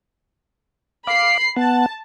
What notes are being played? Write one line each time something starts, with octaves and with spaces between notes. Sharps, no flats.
F5 B5 D6 C7
B3 F#5 A5